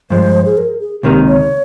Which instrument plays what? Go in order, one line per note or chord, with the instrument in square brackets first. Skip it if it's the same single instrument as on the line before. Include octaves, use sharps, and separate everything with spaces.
[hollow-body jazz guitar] G2 F3 G#3 [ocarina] C5
[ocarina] G#4
A#4
G#4
[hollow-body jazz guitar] C#2 C3 D#3 A#3 D#4 [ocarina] G4
[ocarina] C#5